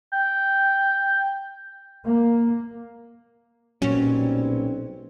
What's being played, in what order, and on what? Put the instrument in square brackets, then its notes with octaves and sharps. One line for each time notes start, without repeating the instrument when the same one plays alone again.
[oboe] G5
[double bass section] A#3
[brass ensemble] B1 G3 C4 [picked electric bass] A#2 F#3 [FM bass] C#4